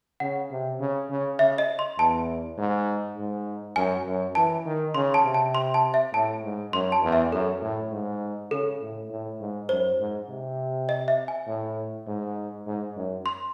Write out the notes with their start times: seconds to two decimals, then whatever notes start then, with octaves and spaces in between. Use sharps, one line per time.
0.20 C#3 F#5
0.51 C3
0.80 C#3
1.10 C#3
1.39 C#3 E5
1.58 D#5
1.79 C6
1.98 E2 A5
2.58 G#2
3.17 G#2
3.76 F#2 G#5
4.06 F#2
4.35 E3 A5
4.66 D#3
4.95 C#3 C6
5.14 A5
5.25 C3
5.34 A5
5.55 C6
5.74 A5
5.94 E5
6.14 A2 A5
6.44 G#2
6.73 F#2 C6
6.92 A5
7.03 E2
7.12 E5
7.32 F#2 A4
7.61 A2
7.92 G#2
8.51 C#3 A4
8.81 A2
9.10 A2
9.40 G#2
9.69 F#2 C5
9.99 G#2
10.29 C3
10.89 D#5
11.08 E5
11.28 G#5
11.47 A2
12.07 G#2
12.67 G#2
12.96 F#2
13.26 C6